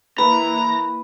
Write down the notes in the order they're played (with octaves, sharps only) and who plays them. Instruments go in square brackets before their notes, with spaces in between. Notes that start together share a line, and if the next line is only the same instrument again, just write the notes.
[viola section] E3 A#3 [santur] B4 [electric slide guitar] A#5